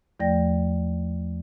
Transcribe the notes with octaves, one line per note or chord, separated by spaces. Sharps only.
E2 F3 A3 D5 G5 A#6